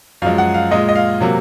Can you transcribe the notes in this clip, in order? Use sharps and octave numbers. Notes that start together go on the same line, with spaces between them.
F#2 F3 G#3 F5
F#5
F5
A#2 G#3 D#5
D#5
F5
C3 F#3 A#3